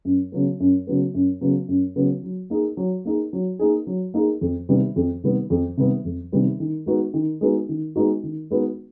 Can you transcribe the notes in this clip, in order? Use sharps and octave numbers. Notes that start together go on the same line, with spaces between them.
F#2
C#3 F#3 B3
F#2
C#3 F#3 B3
F#2
C#3 F#3 B3
F#2
C#3 F#3 B3
F#3
A#3 D#4 G#4
F#3
A#3 D#4 G#4
F#3
A#3 D#4 G#4
F#3
A#3 D#4 G#4
F2
C3 D#3 G3 B3
F2
C3 D#3 G3 B3
F2
C3 D#3 G3 B3
F2
C3 D#3 G3 B3
D#3
G#3 B3 D#4 F#4
D#3
G#3 B3 D#4 F#4
D#3
G#3 B3 D#4 F#4
D#3
G#3 B3 D#4 F#4